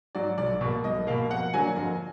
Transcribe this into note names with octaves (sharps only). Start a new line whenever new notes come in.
G#2 F#3 D5
B1 D5
B2 A#3
B1 D#5
B2 A#3 F5
F2 F#5
D3 F#3 A#3 D4 G#5
F2